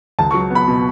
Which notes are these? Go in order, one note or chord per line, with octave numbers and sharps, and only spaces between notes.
C#2 A5
C#6
F#3
B3
B5
B2